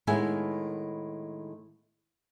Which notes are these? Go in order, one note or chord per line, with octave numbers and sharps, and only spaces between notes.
A2 D#3 G#3 B3 E5 G#5